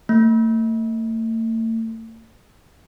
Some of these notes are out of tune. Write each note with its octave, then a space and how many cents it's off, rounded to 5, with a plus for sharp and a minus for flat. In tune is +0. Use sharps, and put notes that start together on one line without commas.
A3 +45